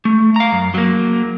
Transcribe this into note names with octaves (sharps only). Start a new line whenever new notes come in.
A3
F5 A#5
F#2
F#3 A#3